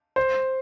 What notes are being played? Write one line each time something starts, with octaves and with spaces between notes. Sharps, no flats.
C5